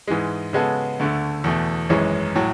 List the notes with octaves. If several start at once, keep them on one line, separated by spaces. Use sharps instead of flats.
G#2 E3 G#3
C#3 G#3 B3 F#4 A4
D2 D3 A3
E2 B2 A3
G#1 F#2 E3 G#3 C#4
A2 F#3